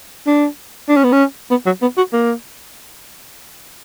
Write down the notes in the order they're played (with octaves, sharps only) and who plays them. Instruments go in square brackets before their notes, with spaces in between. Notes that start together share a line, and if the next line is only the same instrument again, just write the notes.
[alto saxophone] D4
D4
C#4
B3
C#4
B3
F#3
B3
F#4
A#3